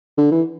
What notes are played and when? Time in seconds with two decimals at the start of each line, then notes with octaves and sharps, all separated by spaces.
0.17 D3
0.31 E3